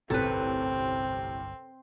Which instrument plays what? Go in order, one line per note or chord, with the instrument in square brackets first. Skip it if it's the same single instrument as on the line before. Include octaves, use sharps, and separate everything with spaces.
[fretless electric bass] G1 C2 [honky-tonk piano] F#2 A2 C3 [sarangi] C4 [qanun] A4 B4